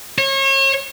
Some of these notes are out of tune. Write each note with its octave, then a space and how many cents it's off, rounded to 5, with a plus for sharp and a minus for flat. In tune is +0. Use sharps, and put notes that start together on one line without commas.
C#5 -35